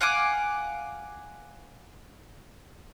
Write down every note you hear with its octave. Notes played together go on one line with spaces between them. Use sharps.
F5 F#5 G#5 D6